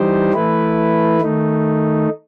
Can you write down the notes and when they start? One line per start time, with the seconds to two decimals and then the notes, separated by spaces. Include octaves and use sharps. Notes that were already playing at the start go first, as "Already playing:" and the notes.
Already playing: E3 G3 D#4 G4 C5
0.33 E3 A3 E4 B4
1.21 D#3 A3 D#4